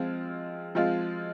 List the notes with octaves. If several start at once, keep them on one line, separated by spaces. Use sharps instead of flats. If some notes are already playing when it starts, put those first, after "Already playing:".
Already playing: F3 G#3 C4 F4
F3 G#3 C4 F4